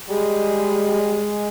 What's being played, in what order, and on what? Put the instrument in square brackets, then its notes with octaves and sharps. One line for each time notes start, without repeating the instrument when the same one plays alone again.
[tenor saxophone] G3 [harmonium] G#3